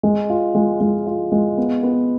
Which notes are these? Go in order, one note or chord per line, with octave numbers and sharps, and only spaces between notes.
G#3
F4
G#3
G#3
F4
G#3
B3
B3